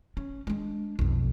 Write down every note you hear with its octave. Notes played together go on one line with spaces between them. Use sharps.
C#4
G#3 D4
B1 F2